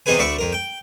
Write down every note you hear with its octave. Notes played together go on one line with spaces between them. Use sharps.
E2 C3 D#4 G#4 B4 G#5
D2 D5 E5 B5 C#6
F2 A#4
G5